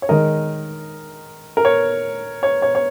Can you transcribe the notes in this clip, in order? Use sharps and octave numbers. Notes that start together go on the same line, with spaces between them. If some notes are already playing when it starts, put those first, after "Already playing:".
C#5
D#3 G#3 A#4 D#5
A#4
C#5
C#5
C#5
C#5